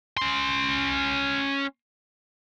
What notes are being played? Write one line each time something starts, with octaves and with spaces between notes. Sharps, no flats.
C#4 C6